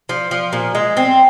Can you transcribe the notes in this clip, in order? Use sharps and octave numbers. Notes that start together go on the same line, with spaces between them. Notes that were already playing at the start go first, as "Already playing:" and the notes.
F3
F3
A#2
G#3
C4